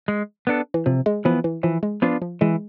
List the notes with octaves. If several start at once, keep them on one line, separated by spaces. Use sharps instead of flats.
G#3
B3 D4 A4
E3
C3 F3
G#3
E3 F3 B3
E3
E3 F3
G#3
F3 B3 D4 F4
F3
E3 G#3